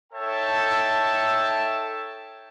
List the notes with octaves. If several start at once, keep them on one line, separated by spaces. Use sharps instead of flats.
D#4 A4 C#5 E5 G5 A5